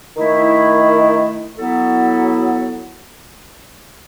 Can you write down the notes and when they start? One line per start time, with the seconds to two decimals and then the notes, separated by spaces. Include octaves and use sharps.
0.16 D#3 A3 E4
1.58 F#3 B3 E4 A4